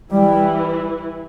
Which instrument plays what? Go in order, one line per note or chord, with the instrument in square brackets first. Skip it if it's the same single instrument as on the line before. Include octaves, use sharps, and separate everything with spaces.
[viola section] E3 E4 [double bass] G3